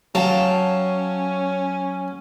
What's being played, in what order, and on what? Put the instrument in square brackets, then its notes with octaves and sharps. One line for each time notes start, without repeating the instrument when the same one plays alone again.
[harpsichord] F#3 [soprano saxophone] C#4 [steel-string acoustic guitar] F5 G5 A5